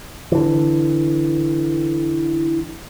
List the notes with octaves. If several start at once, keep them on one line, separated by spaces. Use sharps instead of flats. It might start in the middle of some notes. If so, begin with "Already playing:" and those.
D3 E3